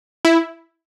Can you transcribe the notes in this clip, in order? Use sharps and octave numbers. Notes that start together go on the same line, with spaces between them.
E4